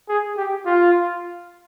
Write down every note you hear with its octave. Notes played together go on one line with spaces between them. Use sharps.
G#4
G4
F4